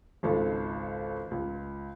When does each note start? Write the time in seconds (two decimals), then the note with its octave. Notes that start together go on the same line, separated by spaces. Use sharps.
0.23 G#1 C#2 A4
1.31 C#2